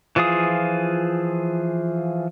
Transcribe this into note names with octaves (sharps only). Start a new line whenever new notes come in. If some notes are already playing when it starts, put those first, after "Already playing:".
E3 F3 F4 G#4 D#6